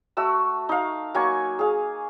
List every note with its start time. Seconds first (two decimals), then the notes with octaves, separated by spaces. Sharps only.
0.17 A3 F#4 E6
0.69 D#4 F5
1.14 F#3 A#3 G#5 C#6
1.59 G#4 F5